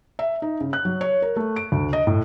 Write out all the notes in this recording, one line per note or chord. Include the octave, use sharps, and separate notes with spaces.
E5
D#4
C#3
F#6
F#3
C#5
A#4
A3
D7
D2
D#5
A2